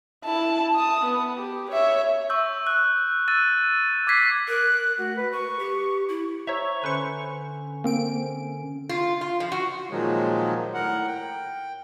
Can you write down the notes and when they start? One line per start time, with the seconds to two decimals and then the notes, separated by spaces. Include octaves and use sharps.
0.25 E4 A5
0.74 A5 D#6
1.05 B3
1.37 G4
1.71 C#5 E5
2.30 C#6 E6 G6
2.67 E6 F#6
3.28 E6 G6 A6 D#7
4.07 D6 G#6 B6 C7
4.48 A#4 F#6
4.98 A3 F#4
5.16 B4
5.32 B4 C#6
5.59 G4
6.08 E4
6.47 C5 C#5 E5 A#5 C#6
6.84 D3 C#4 B4 C5 C#6
7.84 A#3 C4 D7
8.89 F4
9.21 F4
9.40 F3
9.52 F#4
9.91 A#2 D#3 F3 F#3 G#3
10.74 A2 A#4 F#5
11.07 G5